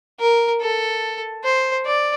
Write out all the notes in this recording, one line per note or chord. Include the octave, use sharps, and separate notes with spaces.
A#4
A4
C5
D5